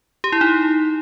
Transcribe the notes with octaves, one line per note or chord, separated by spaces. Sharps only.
G4
E4
D#4